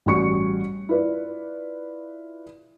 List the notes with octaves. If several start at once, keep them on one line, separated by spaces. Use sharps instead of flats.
A1 G3 C#4 F#4 C#6 C#7
E4 F4 B4 D5